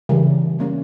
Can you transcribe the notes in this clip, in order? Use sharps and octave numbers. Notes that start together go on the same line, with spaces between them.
C#3 E3 G3
G3 A#3 C#4